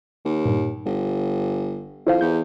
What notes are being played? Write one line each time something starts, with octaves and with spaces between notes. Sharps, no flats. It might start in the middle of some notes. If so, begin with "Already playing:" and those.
D#2
G2 A#2
G1
F2 E4 C5 F5
E2 G6